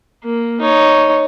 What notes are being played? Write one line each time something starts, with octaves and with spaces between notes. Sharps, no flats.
A#3
D#4 C#5